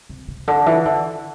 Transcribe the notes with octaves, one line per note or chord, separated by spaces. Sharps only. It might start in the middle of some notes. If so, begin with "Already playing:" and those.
C3
C3
D3
E3
D3